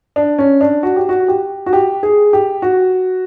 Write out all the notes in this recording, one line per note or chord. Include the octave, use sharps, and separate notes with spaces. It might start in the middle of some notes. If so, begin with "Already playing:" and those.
D4
C#4
D4
F#4
G4
F#4
G4
F#4
G4
G#4
G4
F#4